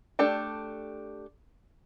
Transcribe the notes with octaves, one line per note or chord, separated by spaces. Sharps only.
A3 D4 G4 A4 G5